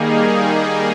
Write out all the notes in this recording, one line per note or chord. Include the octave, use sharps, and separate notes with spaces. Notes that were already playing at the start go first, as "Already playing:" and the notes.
Already playing: D#3 G3 A#3 D#4 G#4